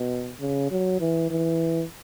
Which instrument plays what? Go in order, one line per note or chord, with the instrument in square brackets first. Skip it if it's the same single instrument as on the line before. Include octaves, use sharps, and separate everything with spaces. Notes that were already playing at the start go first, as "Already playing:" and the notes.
Already playing: [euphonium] B2
C#3
F#3
E3
E3